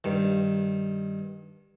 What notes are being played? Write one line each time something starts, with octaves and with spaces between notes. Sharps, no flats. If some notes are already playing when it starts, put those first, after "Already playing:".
G2 D#3